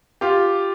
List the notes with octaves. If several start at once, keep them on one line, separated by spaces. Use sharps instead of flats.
F4 G4